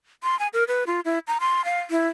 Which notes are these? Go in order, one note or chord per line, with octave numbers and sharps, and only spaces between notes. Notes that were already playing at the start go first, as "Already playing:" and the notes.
C6
G#5
A#4
B4
F4
E4
A#5
C6
F5
E4